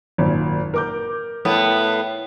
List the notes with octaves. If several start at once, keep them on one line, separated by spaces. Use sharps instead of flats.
G#1 F#2 A#2
A#4 D6 G6
A2 B3